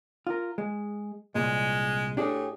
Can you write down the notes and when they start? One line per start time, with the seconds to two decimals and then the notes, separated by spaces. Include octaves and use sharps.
0.27 F4 A#4
0.58 G#3
1.35 C2 A#2 G#3
2.17 A2 D4 G4 G#4